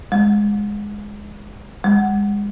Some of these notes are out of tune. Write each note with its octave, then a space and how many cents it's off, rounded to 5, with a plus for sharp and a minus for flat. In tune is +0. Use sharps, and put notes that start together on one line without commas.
G#3 -5
G#3 -30